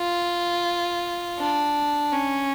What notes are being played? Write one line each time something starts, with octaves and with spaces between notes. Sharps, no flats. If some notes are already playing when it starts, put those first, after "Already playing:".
Already playing: F4
D4
C#4